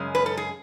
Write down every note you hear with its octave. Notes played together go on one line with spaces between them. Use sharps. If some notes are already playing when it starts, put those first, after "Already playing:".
Already playing: F#2 C#3 G#3 C#4
B4
A4
G#4